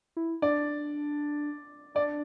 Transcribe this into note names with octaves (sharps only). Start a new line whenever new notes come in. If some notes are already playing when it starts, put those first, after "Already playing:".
E4
D4 D5
D4 D5